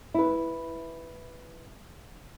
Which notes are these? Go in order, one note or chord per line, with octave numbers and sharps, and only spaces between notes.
E4 B4